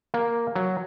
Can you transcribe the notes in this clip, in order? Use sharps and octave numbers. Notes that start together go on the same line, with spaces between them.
A#3
F#3